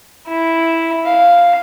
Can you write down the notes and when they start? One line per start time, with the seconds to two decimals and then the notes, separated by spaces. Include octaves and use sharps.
0.28 E4
1.05 F5